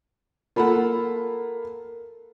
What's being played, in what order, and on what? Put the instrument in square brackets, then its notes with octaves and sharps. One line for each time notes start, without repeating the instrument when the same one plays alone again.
[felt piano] A#3 B5 [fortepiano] F4 A4 F#5